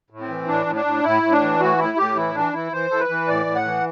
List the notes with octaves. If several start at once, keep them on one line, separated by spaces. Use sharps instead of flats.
A2
C4
E3
A2 D4
A2
D4
A2
A2 E4
A2
D4
E3
A2 F#4
A2 E4
A2 G4
E3 E4
E3 D4
E3 E4
E3 C5
E3 A4
B4
E3
A2 D5
A2
F#5
E3